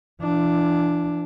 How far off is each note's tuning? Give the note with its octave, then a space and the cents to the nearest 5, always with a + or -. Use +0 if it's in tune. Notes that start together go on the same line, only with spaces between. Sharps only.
E3 +45 D4 +0